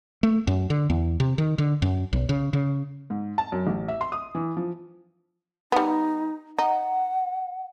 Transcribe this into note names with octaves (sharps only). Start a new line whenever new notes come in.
A3
F#2
D3
E2
C3
D#3
D3
F#2
B1
C#3
C#3
G#2
A5
F#2
A1
E5
C6
D#6
E3
F3
G3 B3 D#4
D#4 F#5